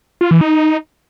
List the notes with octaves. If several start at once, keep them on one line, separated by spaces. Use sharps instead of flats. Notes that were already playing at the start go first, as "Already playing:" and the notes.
F4
E3
D#4